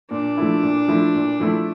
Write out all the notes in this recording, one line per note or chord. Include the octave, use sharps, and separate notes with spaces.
A#2 D4
F3 A3 E4
A#2
F3 A3 E4
A#2
F3 A3 E4